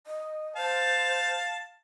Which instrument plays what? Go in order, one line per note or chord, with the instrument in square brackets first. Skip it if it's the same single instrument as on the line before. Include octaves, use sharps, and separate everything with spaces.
[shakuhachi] D#5
[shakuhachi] C5 [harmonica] F5 A5